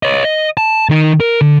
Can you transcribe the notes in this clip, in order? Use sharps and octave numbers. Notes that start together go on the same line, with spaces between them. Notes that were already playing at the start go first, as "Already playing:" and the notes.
C#5 D#5
D#5
A5
D#3 D#4
A#4
D3